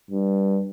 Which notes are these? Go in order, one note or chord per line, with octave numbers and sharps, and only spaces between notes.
G2